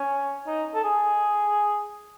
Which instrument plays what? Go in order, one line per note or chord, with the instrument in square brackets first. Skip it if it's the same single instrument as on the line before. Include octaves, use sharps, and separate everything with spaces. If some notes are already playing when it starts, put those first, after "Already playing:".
Already playing: [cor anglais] C#4
D#4
A4
G#4